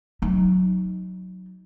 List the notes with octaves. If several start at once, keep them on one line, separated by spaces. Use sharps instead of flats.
F#3 D#4